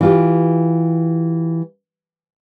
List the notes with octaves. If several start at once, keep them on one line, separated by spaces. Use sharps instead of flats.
E3 F4 G4